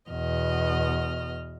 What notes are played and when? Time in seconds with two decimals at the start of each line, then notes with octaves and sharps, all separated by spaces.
0.11 E2 B2 D#5 F6